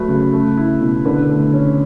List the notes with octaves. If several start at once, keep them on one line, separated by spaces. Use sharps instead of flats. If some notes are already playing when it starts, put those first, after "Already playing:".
Already playing: F#3 A3 B4
C#3
A3
E4
B2
D3 B4
A3
C#4